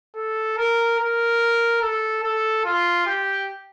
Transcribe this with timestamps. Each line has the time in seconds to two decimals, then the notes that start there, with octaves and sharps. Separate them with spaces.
0.16 A4
0.58 A#4
0.99 A#4
1.82 A4
2.24 A4
2.65 F4
3.07 G4